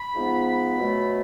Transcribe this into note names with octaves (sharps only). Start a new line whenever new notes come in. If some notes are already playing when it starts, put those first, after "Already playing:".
Already playing: B5
G#2 F3 B3
B5
B2 F#3 A3